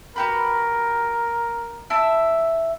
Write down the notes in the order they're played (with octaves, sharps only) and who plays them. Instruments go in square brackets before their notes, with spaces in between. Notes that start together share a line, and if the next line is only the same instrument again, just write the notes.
[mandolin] F#4 G4 B4 [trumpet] A#4
[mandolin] E4 E5 A5